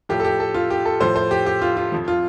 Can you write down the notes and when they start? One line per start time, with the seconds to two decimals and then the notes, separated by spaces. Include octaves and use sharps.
0.09 A2 F3 G4
0.20 A4
0.24 G4
0.40 A4
0.54 F4
0.70 G4
0.86 A4
1.00 A2 F3 C5
1.16 C5
1.31 G4
1.46 G4
1.62 F4
1.77 F4
1.92 F2 F3
2.08 F4